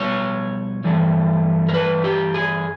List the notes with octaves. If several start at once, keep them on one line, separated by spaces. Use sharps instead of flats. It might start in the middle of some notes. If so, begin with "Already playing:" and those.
Already playing: B2 G3 B3 C#5
G2 E3 A3
A#4
B4
G4
G#4